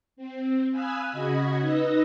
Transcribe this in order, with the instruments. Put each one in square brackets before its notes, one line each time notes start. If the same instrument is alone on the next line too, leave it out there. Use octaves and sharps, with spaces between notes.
[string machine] C4
F5 G#5 B5 D#6 E6 F#6
C#3 F#4 D#5 B5 G#6
D#4 B4 D#5 E6 A#6